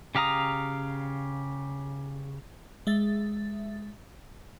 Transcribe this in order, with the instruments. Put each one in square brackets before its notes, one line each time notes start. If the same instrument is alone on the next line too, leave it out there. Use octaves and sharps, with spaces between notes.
[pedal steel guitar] C#3 G4 F5 A#5 D#6
[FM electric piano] G#3 E5 A6